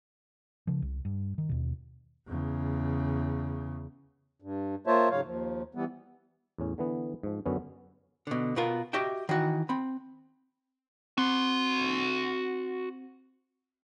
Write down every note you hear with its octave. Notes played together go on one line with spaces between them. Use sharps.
C#3 F3
C2
G2
D#3
D#2 B2
E2 C#3
G2
A#3 F4 C5 C#5 E5 A5
G#2 C#3 F#3 C#5 F5
D#2 F3
E3 G3 B3
E2 A2 C#4
D3 E3 B3
G#2 F3
F#2 D3 B3 C#4
B2 D3
B2 B3 F4 A#4
F#4 G4 D#5 E5 G5
D#3 E3 F#4
C4 B5
C4 F#4 C6